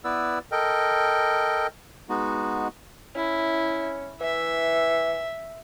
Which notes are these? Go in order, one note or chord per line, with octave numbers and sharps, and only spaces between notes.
B3 E4 B4 D5 E6
A4 A#4 D#5 G5
G#3 B3 D#4 F#4
C#4 E4
E3 E5